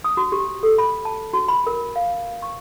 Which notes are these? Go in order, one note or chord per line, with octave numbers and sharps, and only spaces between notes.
D#6
F#4
G4
A4
B5
A5
F#4
B5
A#4
F5
C#6